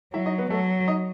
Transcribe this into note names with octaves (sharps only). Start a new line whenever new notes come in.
F#3 E4 E5
D#4 D#5
B3 B4
F#3 A3 A4
D#4 D#5